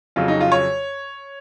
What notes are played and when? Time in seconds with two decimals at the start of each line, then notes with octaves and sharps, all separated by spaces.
0.16 F2 C#3 F#3 F4
0.28 D#4
0.41 F4
0.52 C#5